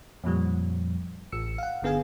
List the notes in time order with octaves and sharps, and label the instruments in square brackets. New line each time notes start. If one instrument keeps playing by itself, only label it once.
[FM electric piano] F2 A#2 F3 G3
A1 E6 C#7
F5 F#5
G1 D3 B3 G#4 F5 G#5